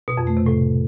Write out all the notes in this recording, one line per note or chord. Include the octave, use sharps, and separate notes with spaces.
B2
F2
A3
C3
A2